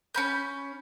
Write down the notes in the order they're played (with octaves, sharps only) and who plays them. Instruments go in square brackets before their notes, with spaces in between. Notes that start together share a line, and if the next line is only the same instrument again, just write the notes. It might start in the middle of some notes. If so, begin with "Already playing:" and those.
[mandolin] C#4 B5 G6